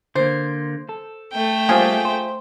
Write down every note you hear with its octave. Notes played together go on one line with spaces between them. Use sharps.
D3 A#3 C5
A4
A3 G5
F3 G3 A#3 C#4 G#4
C5